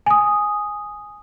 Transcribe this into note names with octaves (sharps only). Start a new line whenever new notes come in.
G#5 D#6